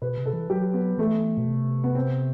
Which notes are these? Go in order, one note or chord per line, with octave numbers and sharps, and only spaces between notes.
B2 B4
C3
A4
E3
F#3 G4
B3
E3 A3
B2
C3
B3
C4